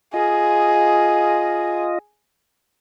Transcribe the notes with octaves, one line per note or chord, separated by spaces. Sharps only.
F4 G#4 D#5